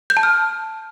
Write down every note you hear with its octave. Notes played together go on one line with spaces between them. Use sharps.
G6
A5
F6